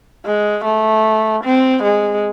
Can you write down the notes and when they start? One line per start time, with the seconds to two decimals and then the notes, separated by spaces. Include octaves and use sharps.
0.26 G#3
0.65 A3
1.44 C4
1.83 G#3